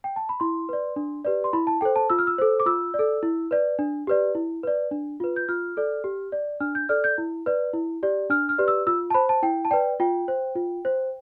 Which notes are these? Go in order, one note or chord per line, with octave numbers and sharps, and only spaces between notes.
G5
A5
B5
E4 C6
B4 D5
D4
G4 B4 D5
C6
E4 B5
A5
A4 C5 G5
A5
F4 E6
F6
E6
A4 C5
D6
F4 E6
D5
A4
E4
B4 D5
D4
G4 B4 D5
E4
B4 D5
D4
F4 B4
G6
F4 F6
A4 D5
G4
D5
D4 F6
G6
A4 D5 F6
G6
E4
B4 D5
E4
G4 D5
D4 F6
F6
G4 B4 D5
E6
F4 E6
A5
C5 B5
A5
E4 G5
A5
B4 D5 G5
F4 G5
C5
F4
C5